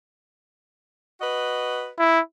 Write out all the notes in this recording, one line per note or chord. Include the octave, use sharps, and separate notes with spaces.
F#4 B4 D#5
E4